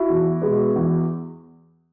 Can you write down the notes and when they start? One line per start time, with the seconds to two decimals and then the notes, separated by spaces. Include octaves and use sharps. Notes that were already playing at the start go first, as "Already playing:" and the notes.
Already playing: E4 F#4
0.09 E2
0.42 B2 G#3 B3
0.76 E2